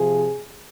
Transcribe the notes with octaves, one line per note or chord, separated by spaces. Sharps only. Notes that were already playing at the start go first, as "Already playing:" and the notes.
Already playing: C3 F3 G#4